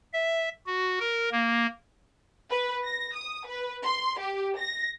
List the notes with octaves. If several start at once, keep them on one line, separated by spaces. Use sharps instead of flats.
E5
F#4
A#4
A#3
B4
A#6
D#6
B4
C6
G4
A#6